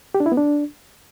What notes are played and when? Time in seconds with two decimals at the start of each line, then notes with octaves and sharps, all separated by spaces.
0.15 G4
0.20 D4
0.26 E4
0.32 B3
0.37 D4